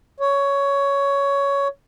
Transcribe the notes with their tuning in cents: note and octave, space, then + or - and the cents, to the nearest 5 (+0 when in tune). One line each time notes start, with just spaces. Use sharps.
C#5 +10